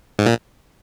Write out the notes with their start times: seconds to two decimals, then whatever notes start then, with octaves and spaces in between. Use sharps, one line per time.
0.19 G#2
0.26 A#2